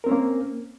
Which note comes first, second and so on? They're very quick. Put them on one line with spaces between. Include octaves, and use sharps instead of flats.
A#4 C4 C#4 A#3